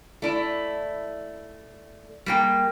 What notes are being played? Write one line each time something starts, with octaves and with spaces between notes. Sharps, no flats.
A3 E4 D5 A5
G3 G#3 A#3 E4 G5